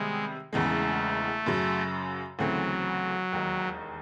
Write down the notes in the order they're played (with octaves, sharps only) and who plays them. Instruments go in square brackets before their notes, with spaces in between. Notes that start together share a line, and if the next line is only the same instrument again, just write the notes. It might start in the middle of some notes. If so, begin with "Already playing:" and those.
Already playing: [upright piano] C3 D#3 G3 B3 [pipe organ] G#3
[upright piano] E1 E2 C#3 E3 G#3 [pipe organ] A3
[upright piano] F#2 C#3 F#3
[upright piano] D2 C#3 E3 A3 C4 [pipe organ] F#3
[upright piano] E1 D#2 D#3